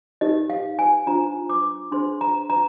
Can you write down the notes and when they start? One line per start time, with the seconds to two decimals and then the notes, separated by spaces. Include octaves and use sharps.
0.21 D#4 G4 A#4 D#5
0.50 F5
0.79 G#5
1.07 D4 F4 C5 A#5
1.50 D6
1.91 D4 G#4 C5 C6
2.21 A#5
2.50 A#5